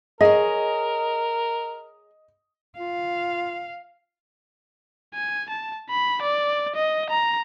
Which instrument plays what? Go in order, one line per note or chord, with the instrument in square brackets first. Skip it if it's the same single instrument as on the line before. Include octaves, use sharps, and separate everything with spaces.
[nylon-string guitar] G#4 C#5 [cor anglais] A#4 [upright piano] D#5
[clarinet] F4 [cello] F5
[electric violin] G#5
A5
B5
D5
D#5
A#5